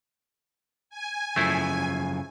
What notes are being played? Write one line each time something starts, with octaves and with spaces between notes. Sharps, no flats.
G#5
F#2 C#3 F3 A3 E4